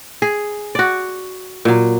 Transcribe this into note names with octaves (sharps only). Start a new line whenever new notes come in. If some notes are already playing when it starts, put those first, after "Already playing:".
G#4
F#4 D5
A#2 F#3